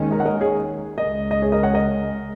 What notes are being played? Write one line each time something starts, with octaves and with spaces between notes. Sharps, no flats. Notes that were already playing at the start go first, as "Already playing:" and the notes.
Already playing: D#2 D#3 G#3 C#4
A#4 D#5
F#5
A#4 D#5
G#4 C#5
C#2 C#3 G#3 A#4 D#5
D#5
G#4 C#5
A#4 D#5
C#5 F#5
A#4 D#5